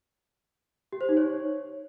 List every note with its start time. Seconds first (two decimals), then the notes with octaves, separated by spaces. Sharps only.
0.92 G4
1.01 C5
1.09 D#4
1.17 C#5